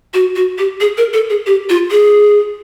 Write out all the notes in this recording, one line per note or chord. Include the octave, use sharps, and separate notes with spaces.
F#4
F#4
G4
G#4
A#4
A4
G#4
G4
F4
G#4